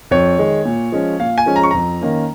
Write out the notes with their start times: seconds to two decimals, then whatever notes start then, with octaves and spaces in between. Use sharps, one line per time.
0.11 F2 C#5
0.38 D#3 G#3
0.65 A#2
0.92 F3 G#3 C#4
1.20 A#2 F5
1.38 G#5
1.46 F3 G#3 C#4
1.56 A#5
1.63 C#6
1.71 F2 A#5
2.01 D#3 A#3 C#4